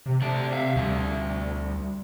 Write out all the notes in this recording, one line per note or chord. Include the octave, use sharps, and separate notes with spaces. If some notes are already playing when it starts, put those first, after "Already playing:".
C3
C3 A3 D5 A5
E5 F5
D2 G3 E5